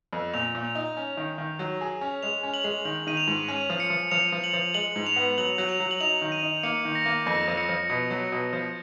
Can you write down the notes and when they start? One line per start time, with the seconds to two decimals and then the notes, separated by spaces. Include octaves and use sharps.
0.13 F2
0.34 A#2 F7
0.55 A#2
0.65 F7
0.75 D#4
0.97 C#4
1.17 D#3
1.38 D#3
1.59 F#3
1.81 G#4
2.01 C#4
2.22 G#3 F7
2.43 C#4
2.54 F#7
2.64 G#3
2.85 D#3 F#7
3.07 D#3 D#7
3.17 F7
3.27 G#2
3.48 C#4 D#7
3.70 F3
3.80 C#7
3.90 F3
4.11 F3 F7
4.32 F3
4.44 F#7
4.53 F3
4.74 G#3 F#7
4.96 G#2
5.06 F7
5.16 B3
5.38 F#3 F#7
5.58 F#3
5.69 F7
5.80 F#3
5.91 F#7
6.01 D#4 F7
6.22 D#3
6.32 D#7
6.43 D#4
6.63 A#3 C#7
6.85 D#3
6.95 A#6
7.06 A#3
7.26 F2 A#6
7.48 F3
7.58 C#7
7.69 F3
7.90 B2
8.10 F#3
8.32 B2
8.53 F3